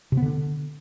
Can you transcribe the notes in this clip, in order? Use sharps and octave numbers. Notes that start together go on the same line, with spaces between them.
C3
B3
D3